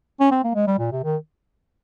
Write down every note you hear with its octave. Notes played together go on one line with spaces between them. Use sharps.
C#4
C4
A#3
G#3
G3
A#2
C3
D#3